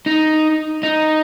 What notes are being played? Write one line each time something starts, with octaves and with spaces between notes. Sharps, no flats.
D#4
D#4